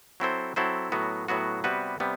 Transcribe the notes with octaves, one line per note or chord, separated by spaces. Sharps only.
F#3 C4 E4 A4 C5
F#3 C4 E4 A4 C5
A2 F#3 B3 F#4
A2 F#3 B3 F#4
C3 G3 B3 F#4 B4
C3 G3 B3